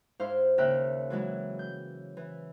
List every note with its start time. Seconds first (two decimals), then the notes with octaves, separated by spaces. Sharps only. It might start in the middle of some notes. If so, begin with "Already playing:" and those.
0.20 G#2 E4 C5 F5 F6
0.58 D#2 C#3 A#4 E5 G5 F#6
1.10 E3 F#3 G#3 E4
1.59 G6
2.17 E3